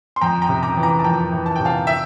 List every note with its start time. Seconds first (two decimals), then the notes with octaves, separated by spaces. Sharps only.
0.16 C6
0.21 F2 G5 A#5
0.42 G5 A#5
0.49 C3
0.63 A#5 D6
0.77 E3
0.83 A#5 D6
0.99 A5
1.04 F2 G5 A#5
1.32 E3
1.46 A5
1.56 C3 G5
1.65 F5 A5
1.87 E5 G5